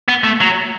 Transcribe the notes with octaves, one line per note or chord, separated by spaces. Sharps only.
B3
A3
F#3